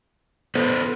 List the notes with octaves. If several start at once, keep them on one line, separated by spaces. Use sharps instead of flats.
B3 A4 B4 C5